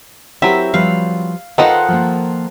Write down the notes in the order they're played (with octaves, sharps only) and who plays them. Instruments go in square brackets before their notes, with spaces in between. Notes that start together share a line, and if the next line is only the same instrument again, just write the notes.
[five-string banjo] F#3 C4 [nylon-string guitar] E4 G4 A#4 [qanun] E5
[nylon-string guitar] F3 G3 B4 [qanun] F5
[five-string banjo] D#3 F4 D#5 [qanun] A4 C5 F#5 [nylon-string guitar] B4
[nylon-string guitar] F3 A#3